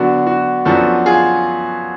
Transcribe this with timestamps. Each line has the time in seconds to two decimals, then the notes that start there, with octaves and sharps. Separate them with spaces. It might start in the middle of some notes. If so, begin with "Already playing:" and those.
Already playing: D3 F#3 B3 D4 F#4
0.27 F#4
0.65 F#2 F3 B3 D4 F#4 A4
1.06 F4 G#4